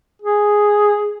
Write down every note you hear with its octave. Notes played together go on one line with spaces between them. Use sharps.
G#4